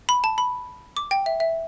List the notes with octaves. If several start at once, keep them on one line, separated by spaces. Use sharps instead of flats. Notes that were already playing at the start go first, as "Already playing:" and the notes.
B5
A5
B5
D6
G5
E5
E5